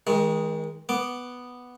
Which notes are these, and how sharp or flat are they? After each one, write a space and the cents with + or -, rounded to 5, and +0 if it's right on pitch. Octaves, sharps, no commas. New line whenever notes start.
D#3 +35 G#3 +0
B3 +0 D6 +0